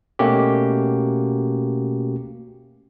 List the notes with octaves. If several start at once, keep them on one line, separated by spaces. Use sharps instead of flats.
B2 A3 A#3 C#4 F#4 G4